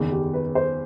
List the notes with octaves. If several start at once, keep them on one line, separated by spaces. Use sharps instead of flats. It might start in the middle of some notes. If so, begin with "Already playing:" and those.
Already playing: F#1 E2 D#3
G4
B4
C5